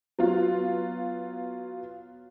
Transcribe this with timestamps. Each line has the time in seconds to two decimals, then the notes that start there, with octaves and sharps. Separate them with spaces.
0.19 F#3 B3 F4